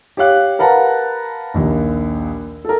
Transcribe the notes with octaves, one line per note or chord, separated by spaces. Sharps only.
G4 C#5 F5 F#6
A#4 B4 F5 F#5 A5 A#5
A#1 D#2
A4 A#4